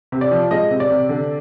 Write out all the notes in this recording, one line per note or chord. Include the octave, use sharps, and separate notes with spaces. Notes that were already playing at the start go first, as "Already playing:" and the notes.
C3
D5
F3
G#3 D#5
C3
D5
C3
D3